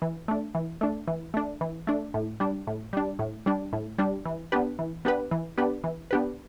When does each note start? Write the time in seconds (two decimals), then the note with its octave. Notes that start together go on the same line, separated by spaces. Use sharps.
0.02 E3
0.28 A3 D4
0.55 E3
0.81 A3 D4
1.07 E3
1.34 A3 D4
1.61 E3
1.87 A3 D4
2.14 A2
2.40 G3 D4
2.67 A2
2.93 G3 D4
3.19 A2
3.46 G3 D4
3.73 A2
3.98 G3 D4
4.25 E3
4.52 B3 D4 G4 B4
4.79 E3
5.05 B3 D4 G4 B4
5.31 E3
5.58 B3 D4 G4 B4
5.84 E3
6.11 B3 D4 G4 B4